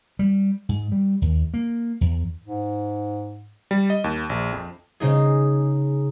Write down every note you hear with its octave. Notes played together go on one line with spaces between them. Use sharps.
G3
G#2
G3
D#2
A#3
E2
G#2
G3
D#5
D#2
A#1
F2
C#3 D#4 G#4